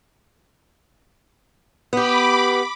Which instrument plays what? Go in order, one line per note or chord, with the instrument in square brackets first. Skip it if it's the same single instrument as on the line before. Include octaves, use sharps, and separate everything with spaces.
[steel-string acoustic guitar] B3 G4 [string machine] B5 D6